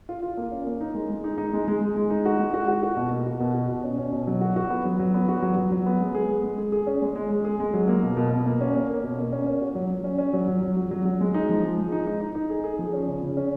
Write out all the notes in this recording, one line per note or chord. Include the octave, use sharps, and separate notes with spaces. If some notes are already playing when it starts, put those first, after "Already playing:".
F4
F4
A#3
C#4
A#3
D#4
G#3
G#3
D#4
D#4
G#3
G#3
G#3
G#3
D#4
F#4
G#3
F#4
F#4
F#4
B2
A#3
F#4
B2
F#4
B2
C#4
C#4
B2
F#3
F#4
F#4
B3
F#3
F#3
B3
F#4
F#3
F#3
F#3
B3
G#3
G#4
G#3
G#3
G#4
G#4
C#4
G#3
G#3
G#3
G#4
G#3
F#3
A#3
B2
B2
B2
A#3
C#4
A#3
A#3
B2
A#3
C#4
C#4
F#4
F#3
F#3
C#4
C#4
F#3
F#3
F#3
F#3
F#3
F#3
G#3
D#4
F3
G#3
G#3
D#4
D#4
D#4
D#4
G#4
G#4
F3
C#4
C#3
C#3
C#4